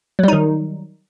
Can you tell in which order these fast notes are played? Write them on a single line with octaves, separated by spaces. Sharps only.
F#3 G3 D#4 D#3